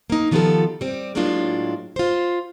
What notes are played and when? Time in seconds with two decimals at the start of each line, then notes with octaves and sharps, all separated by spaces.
0.10 A#3 D#4
0.31 D#3 F3 B3 F4 G4 A4
0.81 G3 C4
1.15 A2 F#3 G#3 A#3 D4 F4
1.96 F4 C5